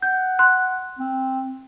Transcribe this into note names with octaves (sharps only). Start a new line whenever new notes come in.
F#5 G6
C6 F#6
C4